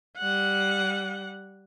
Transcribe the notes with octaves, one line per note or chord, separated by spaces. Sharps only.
G3 F#5